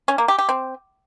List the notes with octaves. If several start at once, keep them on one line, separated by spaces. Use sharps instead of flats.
C#4
A#3
G4
G4
C4